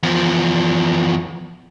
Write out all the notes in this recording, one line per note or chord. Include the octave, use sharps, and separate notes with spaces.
E2 F3